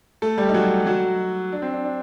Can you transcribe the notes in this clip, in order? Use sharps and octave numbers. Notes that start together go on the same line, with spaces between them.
A3 A4
G3 G4
D#4
F#3 F#4
F#3 F#4
D4
C4
D4
D4